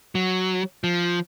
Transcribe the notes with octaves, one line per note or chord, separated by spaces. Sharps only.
F#3
F3